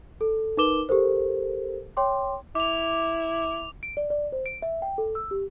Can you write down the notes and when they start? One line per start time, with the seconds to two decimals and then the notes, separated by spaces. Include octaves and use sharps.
0.21 A4
0.57 D#4 A#4 B4 D6 E7 G7
0.89 G4 A4 A#4 C5
1.97 C#5 G5 C6 D6
2.55 E4 D6 F7
3.83 D7
3.97 D5
4.10 D5
4.32 C5
4.46 D7
4.62 E5
4.82 G5
4.98 A4
5.15 E6
5.31 G4